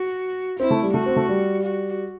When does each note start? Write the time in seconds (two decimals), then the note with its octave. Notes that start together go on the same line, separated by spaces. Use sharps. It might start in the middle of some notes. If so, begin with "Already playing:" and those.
Already playing: F#4
0.60 C4 E4
0.71 A3
0.83 G3
0.94 A3 F#4
1.06 C4
1.16 A3
1.29 G3
1.63 F#4